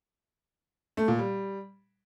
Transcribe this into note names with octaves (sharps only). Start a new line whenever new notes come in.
A3
A#2
G3